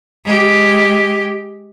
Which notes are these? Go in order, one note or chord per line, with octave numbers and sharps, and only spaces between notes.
G#3 G4